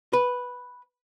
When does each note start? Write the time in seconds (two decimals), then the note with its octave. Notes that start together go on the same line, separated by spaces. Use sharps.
0.13 B4